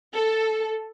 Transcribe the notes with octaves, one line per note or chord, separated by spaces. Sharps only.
A4